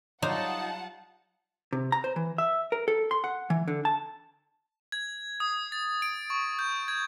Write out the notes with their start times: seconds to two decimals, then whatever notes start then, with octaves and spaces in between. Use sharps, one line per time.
0.22 F#3 G3 D#4 F4 C5 F#5 A5
1.73 C3
1.92 A#5
2.04 C5
2.16 E3
2.38 E5
2.72 A#4
2.88 A4
3.11 C6
3.24 F#5
3.50 E3
3.68 D3
3.85 A5
4.92 G#6
5.40 D#6
5.72 A6
6.02 D7
6.30 C#6
6.59 G6
6.88 G#6